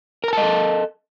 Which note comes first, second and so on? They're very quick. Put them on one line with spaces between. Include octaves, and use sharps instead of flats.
A#4 A#5 A5 D#5 A4